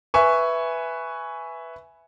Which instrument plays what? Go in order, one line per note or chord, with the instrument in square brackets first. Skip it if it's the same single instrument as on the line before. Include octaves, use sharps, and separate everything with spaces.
[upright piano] B4 E5 G#5 C#6